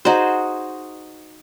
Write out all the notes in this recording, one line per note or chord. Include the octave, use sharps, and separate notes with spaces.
D#4 F#4 G#4 C5